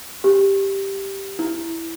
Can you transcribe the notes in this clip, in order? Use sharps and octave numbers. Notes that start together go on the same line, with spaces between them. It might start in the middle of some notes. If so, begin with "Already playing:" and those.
G4
E4